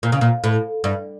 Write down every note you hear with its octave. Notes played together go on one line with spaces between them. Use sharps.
A#2
C#3
A#2
A2
G2